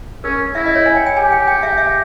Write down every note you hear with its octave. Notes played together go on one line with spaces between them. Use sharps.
C#4 A#4
E4 E5
D#5
C#5
G#5
G5
G5
G4 G#5
G5
G5
E5
E5